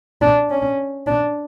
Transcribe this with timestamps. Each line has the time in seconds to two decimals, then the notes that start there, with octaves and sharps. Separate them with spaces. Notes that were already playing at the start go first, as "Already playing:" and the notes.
0.22 D4
0.50 C#4
1.07 D4